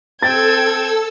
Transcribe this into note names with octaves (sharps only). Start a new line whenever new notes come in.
C4 A4 G5 E6 G#6 A6